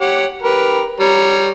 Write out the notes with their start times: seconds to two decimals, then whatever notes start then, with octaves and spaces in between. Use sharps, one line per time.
0.01 G4 C#5 F#5
0.43 G4 A#4 B4
1.00 G3 C#5 A#5